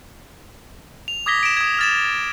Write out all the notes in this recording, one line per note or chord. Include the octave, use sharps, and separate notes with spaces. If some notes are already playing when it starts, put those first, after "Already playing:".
F7
D6 D#6 G#6 A#6 B6 G7
D7 E7
D#6 G#6
F6 A6 E7